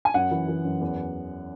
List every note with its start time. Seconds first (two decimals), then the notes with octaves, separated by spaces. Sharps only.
0.05 G#5
0.14 F#2 F#5
0.31 E3
0.48 E3
0.65 F#2
0.81 E2